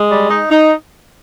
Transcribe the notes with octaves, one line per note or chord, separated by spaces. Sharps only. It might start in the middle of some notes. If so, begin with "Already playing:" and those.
Already playing: G#3
G3
D#4
D#4